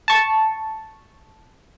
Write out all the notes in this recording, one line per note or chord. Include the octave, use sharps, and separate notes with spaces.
A5 C#6